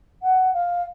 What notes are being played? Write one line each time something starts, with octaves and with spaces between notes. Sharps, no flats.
F#5
F5